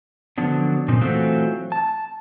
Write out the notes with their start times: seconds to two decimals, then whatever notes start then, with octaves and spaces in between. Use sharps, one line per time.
0.38 D3 F3 F#3 B3 D4
0.88 A#2 C4 D#4
1.01 E3 F#3 A3 C4 F4 F#4
1.72 A5